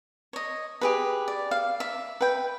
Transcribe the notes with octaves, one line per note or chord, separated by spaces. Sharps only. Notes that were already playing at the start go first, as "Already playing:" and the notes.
C#5 D#5
G4 G#4 B4
D5
F5
E5
B4 G5